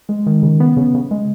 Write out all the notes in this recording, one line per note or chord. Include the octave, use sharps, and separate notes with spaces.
G#3
D#3
C#3
B3
C#3
C#3
G#3